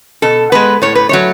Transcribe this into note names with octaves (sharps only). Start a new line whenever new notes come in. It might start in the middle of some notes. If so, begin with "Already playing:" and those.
B2 A4
G#3 B3 B4
A2 C#5
B4
F#3 A3 C#5